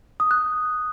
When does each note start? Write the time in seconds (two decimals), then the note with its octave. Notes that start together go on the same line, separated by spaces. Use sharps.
0.20 D#6
0.31 F#6